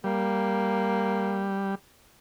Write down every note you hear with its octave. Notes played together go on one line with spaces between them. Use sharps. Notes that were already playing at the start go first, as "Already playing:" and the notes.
G3 A#3